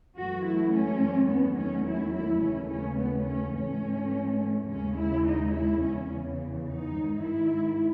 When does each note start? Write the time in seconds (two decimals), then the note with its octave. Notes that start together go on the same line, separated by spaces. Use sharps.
0.15 F#2 E3 A3 F#4
0.44 E4
0.72 C#4
1.29 E2 D#3 F#3 A3 B3
1.57 C#4
1.86 E4
2.14 E4
2.42 D#2 C#3 E3 A3 C#4
2.70 C#4
2.99 B3
3.27 C#4
3.55 G#2 E3 A3 C#4
4.69 D#2 C#3 G#3 C#4
4.97 E4
5.25 D#4
5.54 E4
5.82 E2 C#3 E3 C#4
6.66 D#4
6.95 G#2 D#3 G#3
7.24 E4